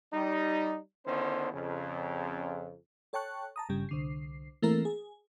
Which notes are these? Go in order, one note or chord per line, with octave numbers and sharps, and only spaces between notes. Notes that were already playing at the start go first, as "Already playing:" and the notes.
G3 D#4
D3 D#3 B3 C#4 E4 C5
F2 C#3
A4 C#5 G5 A5 C#6 F#6
A5 A#5 D#6
G1 G2 C#3 G3
C2 D3 C7
E3 A3 A#3 C4 E4 A#4
G#4